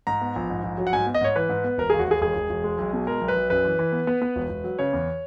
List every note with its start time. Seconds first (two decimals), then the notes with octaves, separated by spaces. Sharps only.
0.07 G#2 A#5
0.21 B3
0.36 A#1
0.50 G#2
0.63 A#1
0.78 F#3
0.87 F#5
0.93 G#2 G#5
1.06 B3
1.14 D#5
1.21 G#2 C#5
1.36 E3 B4
1.49 G#2
1.64 B3
1.78 E1 A#4
1.90 D#2 G#4
1.99 F#4
2.07 D#2 G#4
2.21 E1 G#4
2.36 E1
2.50 E1
2.64 G#3
2.78 B1
2.93 B2
3.06 G#3 A#4
3.21 B1
3.28 B4
3.35 B1
3.50 F#2 B4
3.65 E3
3.79 E3
3.92 B3
4.07 B3
4.22 B3
4.36 E1
4.49 E1
4.64 F#3
4.79 C#3 C#5
4.93 E2